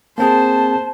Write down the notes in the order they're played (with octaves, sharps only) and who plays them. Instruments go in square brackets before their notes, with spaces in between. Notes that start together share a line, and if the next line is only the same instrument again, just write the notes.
[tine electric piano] A#3 C4 G#4 [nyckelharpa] C5 [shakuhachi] A5